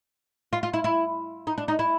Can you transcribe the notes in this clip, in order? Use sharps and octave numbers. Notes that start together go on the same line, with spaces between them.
F4
F4
E4
E4
D#4
D4
D#4
E4